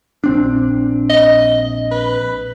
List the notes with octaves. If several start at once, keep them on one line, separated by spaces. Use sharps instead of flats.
A#1 C4 D4
D#5
B4